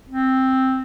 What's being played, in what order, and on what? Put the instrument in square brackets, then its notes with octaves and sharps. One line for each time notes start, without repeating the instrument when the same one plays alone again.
[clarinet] C4